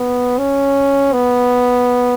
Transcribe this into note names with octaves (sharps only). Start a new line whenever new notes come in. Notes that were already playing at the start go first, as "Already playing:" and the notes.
Already playing: B3
C#4
B3